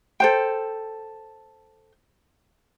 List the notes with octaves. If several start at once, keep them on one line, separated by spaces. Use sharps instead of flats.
A4 C5 G5